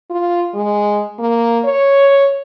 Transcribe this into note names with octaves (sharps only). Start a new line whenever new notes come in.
F4
G#3
A#3
C#5